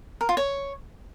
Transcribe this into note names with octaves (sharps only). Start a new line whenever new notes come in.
A#4
F4
C#5